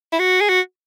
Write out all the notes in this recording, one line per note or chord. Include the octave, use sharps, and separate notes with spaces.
E4
F#4
G#4
F#4